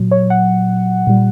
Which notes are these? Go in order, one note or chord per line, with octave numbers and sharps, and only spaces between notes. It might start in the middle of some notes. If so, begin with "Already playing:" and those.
Already playing: A#2 F#3
C#5
F#5
A#2 G3